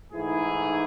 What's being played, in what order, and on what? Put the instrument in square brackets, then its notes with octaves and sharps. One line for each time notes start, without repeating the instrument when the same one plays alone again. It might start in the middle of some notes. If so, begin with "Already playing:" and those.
[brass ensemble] G#2 E3 A3 D#4 E4 G#4